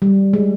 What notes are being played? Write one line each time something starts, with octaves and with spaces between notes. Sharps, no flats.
G3
G#3